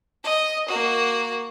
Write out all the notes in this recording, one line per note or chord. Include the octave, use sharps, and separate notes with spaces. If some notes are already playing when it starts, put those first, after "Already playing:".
D#5
A#3 F#4